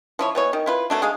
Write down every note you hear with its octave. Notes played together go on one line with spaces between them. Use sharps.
F3 E4 C#5
B2 E3 C#5
D#3
E4 F4 B4
E3 F#3 A3 D4
G#3 G#4 F5